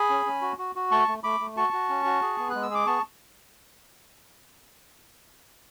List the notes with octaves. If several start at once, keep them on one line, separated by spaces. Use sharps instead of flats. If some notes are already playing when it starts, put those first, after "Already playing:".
Already playing: G#4 G#5 B5
C#4
C#4
F#4
F#4
F#4
A3 A5 C#6
A3
A3 B5 D6
A3
F#4 A5 C#6
F#4
C#4
F#4
G#4
B3
G#3 F#6
E6
G#4 D6
B3 A5 C#6